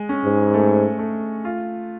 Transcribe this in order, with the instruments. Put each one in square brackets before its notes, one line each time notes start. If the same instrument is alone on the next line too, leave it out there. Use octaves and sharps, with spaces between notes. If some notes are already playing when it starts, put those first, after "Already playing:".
Already playing: [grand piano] G#3
C#4
[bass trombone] G#2
[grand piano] A3
A3
F4